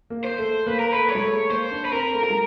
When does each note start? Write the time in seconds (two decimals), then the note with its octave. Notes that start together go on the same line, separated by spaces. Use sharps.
0.10 A#3
0.24 C5
0.39 A3
0.66 A#3 B4
0.80 A#4
0.92 A3 B4
1.09 C#5
1.15 G#3
1.23 A3
1.51 A#3 C5
1.71 D4
1.85 B4
1.92 C4 A#4
2.14 A3
2.24 A#4
2.30 G#3